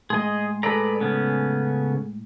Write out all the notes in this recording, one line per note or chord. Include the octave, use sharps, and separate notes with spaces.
A2 G#3 G#4 D#5 G#5 C6
G#4 A4 B4 D5 A#5
C#3 B3 C#4